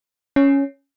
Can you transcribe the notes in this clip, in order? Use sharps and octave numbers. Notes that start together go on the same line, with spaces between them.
C#4